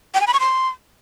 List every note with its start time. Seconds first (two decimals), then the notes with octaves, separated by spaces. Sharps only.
0.14 G5
0.21 G#5
0.27 B5
0.33 C#6
0.40 C6